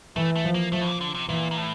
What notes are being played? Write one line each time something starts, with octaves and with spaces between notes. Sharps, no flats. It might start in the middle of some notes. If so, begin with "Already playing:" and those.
E3 A3
A3
F3
A#3
F3 A3
A2
A#2
D3
C3
A#2 E3
A#2
A2